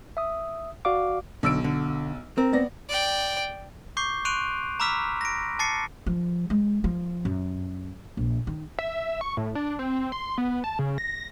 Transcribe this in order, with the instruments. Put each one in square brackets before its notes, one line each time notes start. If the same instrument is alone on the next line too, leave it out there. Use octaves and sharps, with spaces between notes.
[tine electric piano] E5 D#6
F#4 D5 F5 D6
[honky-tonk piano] B1 E6 D7 [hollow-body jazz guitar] D3
[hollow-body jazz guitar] D3
[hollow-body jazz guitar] C4 [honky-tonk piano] A#4
[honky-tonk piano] B3 D5 A#6
[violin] D5 G5
[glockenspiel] C#6 D6 G6 C7
C6 C#6 F#6 D7 D#7 F7
A#5 B5 D6 E6 F6 B6
A#6 D7
A5 D6 A6 C7 C#7
[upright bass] F3
G#3
F3
F#2
A#1
D#3
[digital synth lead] E5
E5
C#6
A2
D4
C4
C4
C6
B3
A5
C#3
A#6